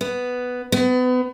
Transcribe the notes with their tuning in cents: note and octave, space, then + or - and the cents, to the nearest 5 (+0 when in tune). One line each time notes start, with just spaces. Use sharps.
B3 +5
B3 +30